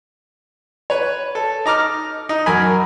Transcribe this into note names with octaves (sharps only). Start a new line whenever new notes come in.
B4 C#5
A4
D#4 A#5 D6 F6
D#4
F#2 A#4 G#5 B5